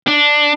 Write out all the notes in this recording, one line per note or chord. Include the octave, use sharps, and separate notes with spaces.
D4